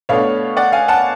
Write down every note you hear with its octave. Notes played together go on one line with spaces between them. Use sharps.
B2 A3 D4 C#5 F5
D5 F#5
F5 G#5
F#5 A5